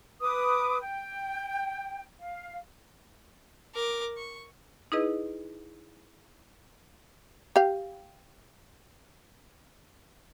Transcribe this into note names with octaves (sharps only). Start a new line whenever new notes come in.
B4 D6 D#6
G5
F5
A#4 D6
C#6
D#4 E4 G#4 B4 D#5
G4 F5